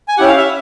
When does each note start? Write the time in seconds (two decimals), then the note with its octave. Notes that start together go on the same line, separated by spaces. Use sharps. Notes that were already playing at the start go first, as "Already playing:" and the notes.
0.08 G#5
0.18 C#4 E4 G4 F#5
0.28 F5
0.37 E5